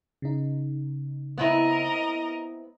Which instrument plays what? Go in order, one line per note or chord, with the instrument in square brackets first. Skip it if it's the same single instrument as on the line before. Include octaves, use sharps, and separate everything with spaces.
[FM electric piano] C#3 D#4
[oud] B3 C4 E4 [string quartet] A#4 D#5